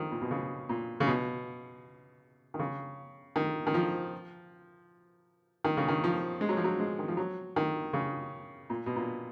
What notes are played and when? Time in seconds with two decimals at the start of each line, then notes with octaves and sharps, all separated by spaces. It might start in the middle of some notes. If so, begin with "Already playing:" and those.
Already playing: D#3 F3
0.12 A#2
0.21 B2
0.31 C#3
0.69 A#2
1.00 C#3
1.07 B2
2.54 D#3
2.59 C#3
3.36 D#3
3.67 D#3
3.74 F3
5.64 D#3
5.77 C#3
5.88 D#3
6.04 F3
6.41 G#3
6.49 F#3
6.57 F3
6.64 F#3
6.80 G#3
6.99 D#3
7.08 F3
7.17 F#3
7.56 D#3
7.93 C#3
8.70 A#2
8.86 B2
8.96 A#2